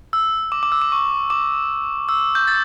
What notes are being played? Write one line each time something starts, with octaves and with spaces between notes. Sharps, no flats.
E6
D6
D6
E6
D6
C#6
D6
E6
G6
A6